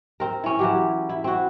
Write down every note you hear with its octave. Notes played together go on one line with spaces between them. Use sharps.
C4 A#4
C#4 E4
E3 F#3 G4
E4
C4 F#4